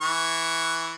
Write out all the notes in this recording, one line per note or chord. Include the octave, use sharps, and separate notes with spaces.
E3 C#6